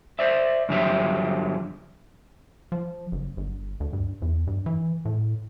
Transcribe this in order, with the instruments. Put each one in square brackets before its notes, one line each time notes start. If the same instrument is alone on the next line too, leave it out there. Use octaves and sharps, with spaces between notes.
[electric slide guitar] C5 D5 E5
G2 D3 F3 F#3 G4 E5
[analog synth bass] F3
F#1
G1
D2
G2
E2
G2
E3
A2